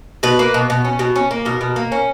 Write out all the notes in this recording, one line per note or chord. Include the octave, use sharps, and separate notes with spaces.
B2 B4
A#3
B2
B2
C#4
B2
C#4
A#3
B2 A#4
B2
A#3
C#4